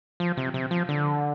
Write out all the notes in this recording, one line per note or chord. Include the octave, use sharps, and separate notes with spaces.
F3
C3
C3
F3
D3